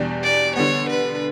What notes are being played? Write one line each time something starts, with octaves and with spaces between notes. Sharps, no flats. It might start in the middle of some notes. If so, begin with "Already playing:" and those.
Already playing: E2 B2 G3 D4 G4
D5
D3 G3 B3 C#5
B4